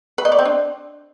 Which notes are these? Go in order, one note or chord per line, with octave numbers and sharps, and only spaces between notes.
B4
D#5
D5
C4
D4